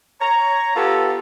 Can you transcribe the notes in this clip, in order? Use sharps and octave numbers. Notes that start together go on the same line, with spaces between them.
C#5 A#5
B3 F4 G4 A4